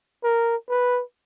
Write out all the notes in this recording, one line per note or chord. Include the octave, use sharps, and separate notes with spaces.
A#4
B4